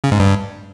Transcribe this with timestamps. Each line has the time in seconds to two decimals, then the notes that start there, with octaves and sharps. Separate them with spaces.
0.04 C#3
0.12 G#2
0.19 G2